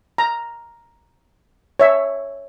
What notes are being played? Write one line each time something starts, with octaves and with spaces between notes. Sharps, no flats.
A#5
C#5 E5